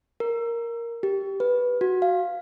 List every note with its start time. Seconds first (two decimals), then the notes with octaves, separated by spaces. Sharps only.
0.20 A#4
1.03 G4
1.40 B4
1.81 F#4
2.02 F5